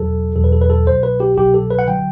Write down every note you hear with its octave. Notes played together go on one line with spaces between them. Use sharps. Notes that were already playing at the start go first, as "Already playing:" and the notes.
Already playing: E2 B2 F#3 A4
E2 B2 F#3 A4
B4
A4
B4
A4
C2 B2 F#3 C5
B4
G4
C2 B2 F#3 G4
A4
B4
F#5
D3 F#3 G5